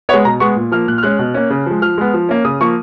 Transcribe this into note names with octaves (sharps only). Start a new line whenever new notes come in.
G#3 B3 C#5
B2 A#5
G#3 B3 C#6
A#2
F3 A#3 F6
A#2 F#6
F6
G#3 C#4 F#6
B2
A#3 C#4
C#3
F3 G#3
F3 F6
G#3 B3
F3
A#3 C#4
C#3 D#6
F3 A#3 C#6